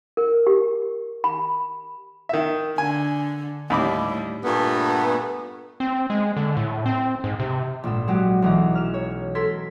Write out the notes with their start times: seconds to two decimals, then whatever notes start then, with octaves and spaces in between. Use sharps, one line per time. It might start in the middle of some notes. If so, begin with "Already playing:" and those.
0.17 A#4
0.47 G4
1.24 B5
2.29 D#3 E5
2.78 D3 G#5
3.70 D#2 A2 G3 B5 D6
4.44 G2 A#2 A3 B3
5.80 C4
6.10 G#3
6.37 D3
6.57 A2
6.86 C4
7.24 G#2
7.40 C3
7.83 A#1 G#2 A4 E7
8.07 F#3 G#3 F#4 G4
8.42 B1 E3 A#5
8.73 C#4 F6 E7
8.94 C#5
9.35 A4 A#4 C6 G#6 B6